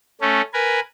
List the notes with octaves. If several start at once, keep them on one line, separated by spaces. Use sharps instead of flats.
A3 C#4
A#4 B4 G#5